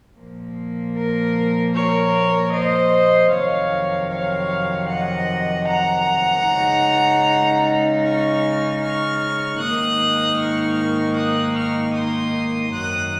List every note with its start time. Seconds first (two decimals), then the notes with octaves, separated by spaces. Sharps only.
0.18 A#2 F3 A#3
0.97 A#4
1.75 A#4 C#5
2.53 C5 D#5
3.32 F2 C3 D#3 F#3 C#5 F5
4.10 C#5 F5
4.89 D#5 F#5
5.67 F#5 A#5
6.45 C#3 G#3 D#4
8.03 C#6 F6
8.81 C#6 F6
9.59 G#2 D#3 A#3 D#4 D#6 F#6
10.37 C#6 F6
11.16 D#6 F#6
11.55 C#6 F6
11.94 C6 D#6
12.72 F#2 D#3 F#3 D#6 F#6